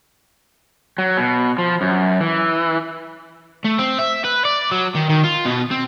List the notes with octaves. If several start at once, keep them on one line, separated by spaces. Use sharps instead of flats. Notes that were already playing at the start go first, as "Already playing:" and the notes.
F#3
B2
F3
F#2
E3
A3
C4
E5
B4
D5
F#3
D#3
D#3
F4
B2
C4